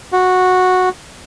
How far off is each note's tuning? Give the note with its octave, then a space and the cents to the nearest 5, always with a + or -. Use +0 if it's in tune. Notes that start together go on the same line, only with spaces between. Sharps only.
F#4 -10